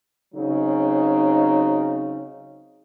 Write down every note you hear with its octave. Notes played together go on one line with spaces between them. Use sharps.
C#3 F#3 C4 D#4